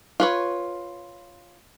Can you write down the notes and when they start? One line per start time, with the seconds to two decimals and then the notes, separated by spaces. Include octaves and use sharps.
0.20 F4 B4 C#5